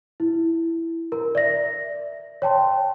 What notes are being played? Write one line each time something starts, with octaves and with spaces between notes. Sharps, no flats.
E4
A#4
D5 E5 A#6
C#5 G5 A5 C6